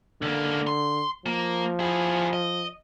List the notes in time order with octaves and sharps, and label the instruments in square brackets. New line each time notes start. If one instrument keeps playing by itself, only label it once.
[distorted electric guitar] C#2 A#3 [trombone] D3
[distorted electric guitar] C6
[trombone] F3 [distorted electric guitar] A#3
[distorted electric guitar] E4 G#4
D#5